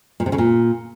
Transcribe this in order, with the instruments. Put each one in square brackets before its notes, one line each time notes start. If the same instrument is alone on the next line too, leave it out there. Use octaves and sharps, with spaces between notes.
[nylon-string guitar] A#2
C3
C#3
A#2